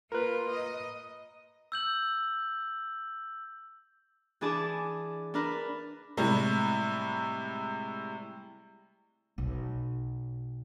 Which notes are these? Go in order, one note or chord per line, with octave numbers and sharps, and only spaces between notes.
A#3 F4 A#4 B4
D#5
E6 G6 F#7
E3 D4 G#4 A5 D6
D4 A#4 B4
A2 C3 G3 G#3
B1